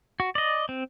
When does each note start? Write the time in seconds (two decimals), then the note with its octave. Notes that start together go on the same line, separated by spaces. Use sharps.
0.20 F#4
0.35 D5 D#5
0.69 C4